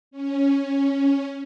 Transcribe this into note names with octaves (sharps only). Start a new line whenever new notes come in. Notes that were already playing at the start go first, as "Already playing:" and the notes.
C#4